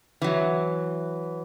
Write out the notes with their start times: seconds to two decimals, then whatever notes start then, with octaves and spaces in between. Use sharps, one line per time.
0.22 E3 F#3